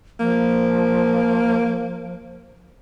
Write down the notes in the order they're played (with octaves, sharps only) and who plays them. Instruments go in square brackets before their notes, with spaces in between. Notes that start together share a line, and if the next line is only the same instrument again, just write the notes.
[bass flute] F3 [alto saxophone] A#3